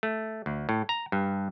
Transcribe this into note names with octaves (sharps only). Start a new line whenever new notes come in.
A3
D2
A2
A#5
G2